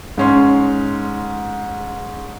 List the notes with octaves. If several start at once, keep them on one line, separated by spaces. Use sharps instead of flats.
G#2 C#4 C6